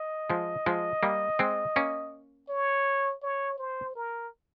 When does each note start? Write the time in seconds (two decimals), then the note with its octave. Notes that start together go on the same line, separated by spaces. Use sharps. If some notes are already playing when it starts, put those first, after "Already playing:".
Already playing: D#5
0.30 F3 G#3
0.66 F3 G#3
1.03 G3 A#3
1.39 G#3 C4
1.76 A#3 C#4
2.49 C#5
3.23 C#5
3.58 C5
3.95 A#4